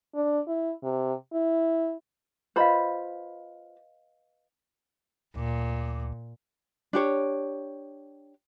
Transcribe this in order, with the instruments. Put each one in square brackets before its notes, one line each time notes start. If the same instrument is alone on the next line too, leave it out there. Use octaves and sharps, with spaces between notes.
[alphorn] D4
E4
C3
E4
[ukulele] F4 C5 B5 [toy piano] B4 D#5 F5
[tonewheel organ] D2 [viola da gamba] A#2
[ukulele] D4 G4 C#5